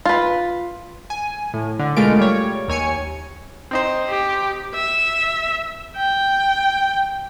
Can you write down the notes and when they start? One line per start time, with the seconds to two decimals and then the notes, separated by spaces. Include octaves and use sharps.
0.06 F4 B4
1.10 G#5
1.54 A2
1.79 D3
1.97 B2 G#3 A3 F4 A#4 D7
2.18 G3 C#5
2.68 D#2 C#5 G#5 C#7
3.71 C4 D#4 C5
4.09 G4
4.74 E5
5.96 G5